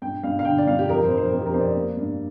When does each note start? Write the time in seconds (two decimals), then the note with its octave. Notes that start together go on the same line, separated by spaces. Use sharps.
0.02 G2 G5
0.23 G2 F5
0.39 F5
0.45 D3 G5
0.58 D5
0.67 G2 F5
0.79 G4
0.89 F2 A#4
1.04 C5
1.10 F2
1.17 C5
1.31 F2 A#4
1.41 G4
1.46 A#4
1.53 F2 C5
1.60 D5
1.76 A#3
1.97 G2